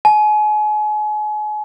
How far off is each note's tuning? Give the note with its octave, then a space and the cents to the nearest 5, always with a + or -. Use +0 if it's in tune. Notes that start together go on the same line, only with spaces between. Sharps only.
G#5 +35